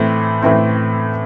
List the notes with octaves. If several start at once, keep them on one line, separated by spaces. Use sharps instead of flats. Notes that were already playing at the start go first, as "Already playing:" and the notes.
Already playing: A2 E3 A3 C4 E4
A2 E3 A3 C4 E4